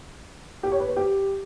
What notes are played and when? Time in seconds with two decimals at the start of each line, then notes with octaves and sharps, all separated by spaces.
0.63 G4
0.72 C#5
0.80 B4
0.88 C5
0.96 G4